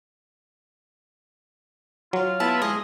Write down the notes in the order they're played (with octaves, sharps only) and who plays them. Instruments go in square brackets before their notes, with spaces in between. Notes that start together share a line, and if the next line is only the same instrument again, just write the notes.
[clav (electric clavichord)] F#3 [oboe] F4
[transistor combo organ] B3 E4 [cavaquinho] A5
[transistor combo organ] G#3 [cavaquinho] D#5